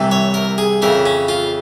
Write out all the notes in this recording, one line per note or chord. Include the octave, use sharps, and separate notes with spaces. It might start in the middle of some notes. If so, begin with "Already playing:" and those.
Already playing: C2 C3 E3
C#5
A#4
G#4
F2 C#3 E3 A#4
C#4
F4